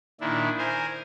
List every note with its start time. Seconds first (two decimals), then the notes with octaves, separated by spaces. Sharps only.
0.20 A#2 D#3 D4 E4
0.58 A#4 C5 G#5